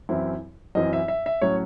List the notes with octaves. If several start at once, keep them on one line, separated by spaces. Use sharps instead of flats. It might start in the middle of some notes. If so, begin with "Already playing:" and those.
F#2 E3 C4 E4
F#2 E3 C4 E4 D#5
E5
E5
E5
A2 F#3 C#4 C#5